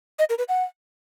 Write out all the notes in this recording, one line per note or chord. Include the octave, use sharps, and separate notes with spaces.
D#5
A#4
B4
F#5